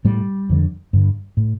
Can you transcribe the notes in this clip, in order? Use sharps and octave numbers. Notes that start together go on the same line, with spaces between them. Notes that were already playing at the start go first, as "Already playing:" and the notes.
A2 G3
F2 D3
G2 D3
A2